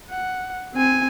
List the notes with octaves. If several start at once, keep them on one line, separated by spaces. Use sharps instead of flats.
F#5
C4 G#5